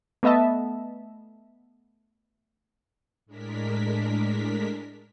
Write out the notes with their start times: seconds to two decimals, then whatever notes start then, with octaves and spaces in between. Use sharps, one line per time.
0.23 A3 B3 D#5 E5 A5
3.26 A2 G#3 D4 A#4 B6